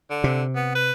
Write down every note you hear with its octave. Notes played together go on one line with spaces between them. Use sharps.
D3
C3
B3
B4